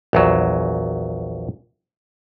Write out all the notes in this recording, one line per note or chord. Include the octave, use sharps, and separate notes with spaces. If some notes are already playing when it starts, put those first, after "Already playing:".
A#1 E2 F#3